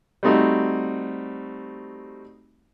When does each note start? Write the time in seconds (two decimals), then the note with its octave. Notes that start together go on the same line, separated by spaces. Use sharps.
0.23 G3 A3 C4 D#4 F#4